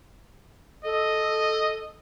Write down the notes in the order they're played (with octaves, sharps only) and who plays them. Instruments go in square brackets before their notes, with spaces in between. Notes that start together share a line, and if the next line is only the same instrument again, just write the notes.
[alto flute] A4 [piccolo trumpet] D#5